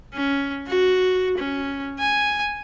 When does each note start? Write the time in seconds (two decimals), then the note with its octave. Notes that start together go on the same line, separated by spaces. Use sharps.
0.14 C#4
0.67 F#4
1.38 C#4
1.99 G#5